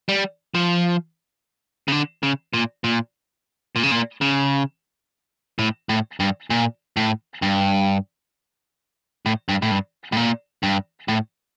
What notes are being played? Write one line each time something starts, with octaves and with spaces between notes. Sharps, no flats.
G3
F3
C#3
D3
C#3
A#2
A#2
A#2
C#3
A#2
C#3
A2
A2
G2
A#2
A2
G2
A2
G2
A2
G2
A2
A#2
G2
A2